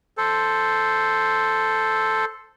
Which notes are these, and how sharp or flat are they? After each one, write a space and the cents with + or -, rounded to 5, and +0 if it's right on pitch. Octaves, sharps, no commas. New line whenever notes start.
A4 +0 C5 +0